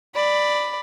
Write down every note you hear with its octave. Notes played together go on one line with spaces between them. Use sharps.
D5 B5